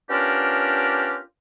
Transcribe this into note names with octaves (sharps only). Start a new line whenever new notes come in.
B3 C#4 D4 F4 G4 A#4